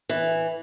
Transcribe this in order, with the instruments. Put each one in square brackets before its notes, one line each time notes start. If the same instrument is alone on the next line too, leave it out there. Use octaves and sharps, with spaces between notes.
[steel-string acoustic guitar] E3